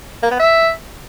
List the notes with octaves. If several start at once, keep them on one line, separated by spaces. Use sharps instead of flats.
A#3
B3
E5